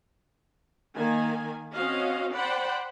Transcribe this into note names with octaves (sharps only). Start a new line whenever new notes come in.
D#3 A#3 G#5
C4 C#4 F#4 D#5 F5
C5 D5 F#5 G5 B5